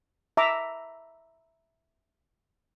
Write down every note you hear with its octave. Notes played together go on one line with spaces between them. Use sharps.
E5 A#5 D6